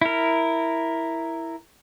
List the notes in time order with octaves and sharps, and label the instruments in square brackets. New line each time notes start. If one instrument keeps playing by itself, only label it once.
[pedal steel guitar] E4 A#4